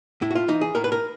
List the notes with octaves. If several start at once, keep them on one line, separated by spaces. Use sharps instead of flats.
A2 E4
F#4
F4
E3 D#4
G#4
A2 A#4
B4
A#4